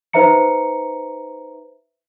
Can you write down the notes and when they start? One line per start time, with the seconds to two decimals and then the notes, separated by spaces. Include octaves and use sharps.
0.13 D#4 B4 C5 E5 A#5 C#7